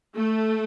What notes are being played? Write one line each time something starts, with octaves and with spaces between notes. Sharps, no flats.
A3